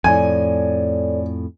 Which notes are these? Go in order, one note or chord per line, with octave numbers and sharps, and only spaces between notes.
F2 A2 A4 C#5 D5 G#5